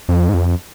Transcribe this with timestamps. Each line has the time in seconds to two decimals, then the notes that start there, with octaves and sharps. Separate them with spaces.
0.09 F2
0.29 G#2
0.34 F2